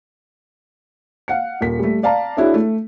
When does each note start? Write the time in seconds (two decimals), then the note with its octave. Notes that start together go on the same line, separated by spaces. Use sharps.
1.28 F5 F#5 C#7
1.61 D#1 A#4 B6
1.79 G3 A3
2.03 D5 F5 A5 A#5
2.37 D4 E4 F#4 G#4 C#5 E5
2.54 A3